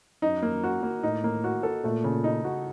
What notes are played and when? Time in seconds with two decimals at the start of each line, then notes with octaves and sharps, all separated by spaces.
0.22 F#2 D#4
0.42 A#3
0.64 F#4
0.83 A#3
1.03 A2 D#4
1.24 A#3
1.44 F#4
1.63 A4
1.84 A#2 A3
2.04 C#3
2.24 D#4
2.44 F#4